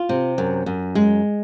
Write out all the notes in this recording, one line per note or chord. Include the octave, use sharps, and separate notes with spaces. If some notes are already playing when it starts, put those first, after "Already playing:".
Already playing: F4
C3
F#2
F#2
G#3